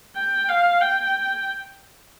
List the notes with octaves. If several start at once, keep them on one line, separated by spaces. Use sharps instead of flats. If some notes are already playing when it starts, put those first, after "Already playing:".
G5
F5
G5